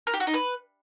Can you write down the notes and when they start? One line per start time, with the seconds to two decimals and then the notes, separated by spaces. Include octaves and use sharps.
0.07 A#4
0.14 G4
0.20 F#4
0.27 D#4
0.34 B4